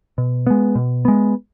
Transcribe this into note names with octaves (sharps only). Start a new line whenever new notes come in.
B2
G#3 B3
B2
G#3 B3